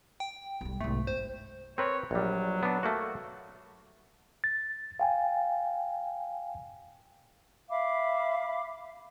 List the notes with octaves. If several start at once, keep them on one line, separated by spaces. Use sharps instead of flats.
G5
B1 G3
B1 G#2 A3
G1 C5
C4 A#4 B4 C#5
A#1 F#3 G3
B3 D4
A3 A#3 F#4
A6
F5 G5 G#5
E5 F5 B5 D6